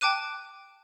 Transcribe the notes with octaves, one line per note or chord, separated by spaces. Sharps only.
G5 A5 D6 F#6 D#7